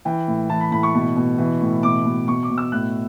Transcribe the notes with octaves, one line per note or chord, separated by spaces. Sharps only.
E3 G5
A2
E3 A5
B5
A2 B5
C#6
B2
B2
E3
A2
B2 D6
B2
B2 C#6
D6
B2
E6
A2 F#6